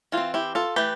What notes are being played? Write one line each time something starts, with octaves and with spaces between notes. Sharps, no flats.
E3 G3 F4
C4
E4 G4
F4 A4
E3 A3 G4 B4